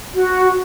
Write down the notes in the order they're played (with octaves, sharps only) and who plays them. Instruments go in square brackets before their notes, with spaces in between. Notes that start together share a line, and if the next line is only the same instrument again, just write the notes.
[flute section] F#4